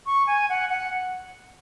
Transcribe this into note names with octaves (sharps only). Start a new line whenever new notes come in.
C#6
G#5
F#5
F#5